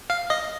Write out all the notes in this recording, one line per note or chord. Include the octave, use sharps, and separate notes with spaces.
F5
D#5